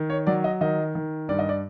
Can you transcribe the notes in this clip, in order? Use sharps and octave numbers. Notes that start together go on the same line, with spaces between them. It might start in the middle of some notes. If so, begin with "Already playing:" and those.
Already playing: D#3
C#5
F#3 D5
D#5
D#3 D#5
D#3
G2 D5
D#5
D5